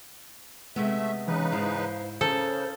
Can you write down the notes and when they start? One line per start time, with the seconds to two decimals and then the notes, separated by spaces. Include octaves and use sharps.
0.76 C3 G#3 A3 B3 E5
1.28 C#3 E3 D#4 B4
1.52 G#2 E4 C5 F5
2.21 C#3 C#4 A4 A#4 C5